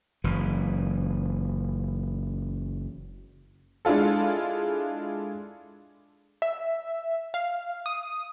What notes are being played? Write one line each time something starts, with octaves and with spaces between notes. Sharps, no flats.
F#1 E3
G#3 D4 E4 F4 A4
E5
F5
D#6